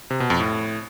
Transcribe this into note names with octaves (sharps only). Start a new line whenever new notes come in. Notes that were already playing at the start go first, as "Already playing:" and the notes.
C3
B2
F2
A2